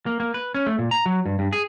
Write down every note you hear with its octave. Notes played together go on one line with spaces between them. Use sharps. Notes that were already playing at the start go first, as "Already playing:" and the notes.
A#3
A#3
B4
C#4
A3
A#2
A#5
F#3
G2
G2
G#4